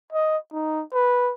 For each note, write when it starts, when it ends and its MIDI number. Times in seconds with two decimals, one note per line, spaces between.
0.12 0.37 75
0.53 0.84 63
0.93 1.33 71